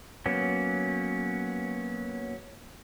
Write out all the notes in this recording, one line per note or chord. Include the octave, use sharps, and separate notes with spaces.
F#3 A#3 B3 C#4